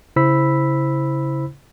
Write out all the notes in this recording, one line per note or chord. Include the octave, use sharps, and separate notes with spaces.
C#3 E4 C5 B5 E6 B6